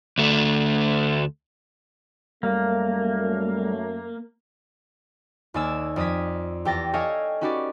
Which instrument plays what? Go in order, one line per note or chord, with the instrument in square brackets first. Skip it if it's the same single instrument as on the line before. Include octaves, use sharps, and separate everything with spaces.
[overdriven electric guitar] D2 A3
[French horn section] F#2 A3 [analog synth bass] G3 [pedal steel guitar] A#3
[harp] D#2 A#3 D5 G#5 E6 E7
F2 D5 D#6 G#6 B6
E2 G4 G5 A6 A#6
A4 C#5 D#5 F5 G5 G#5
C#4 D#4 F#4 G4 B4 D5